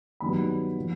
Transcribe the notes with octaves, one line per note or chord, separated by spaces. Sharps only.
G2 D#3 F#3 B3 B5
A#2 F3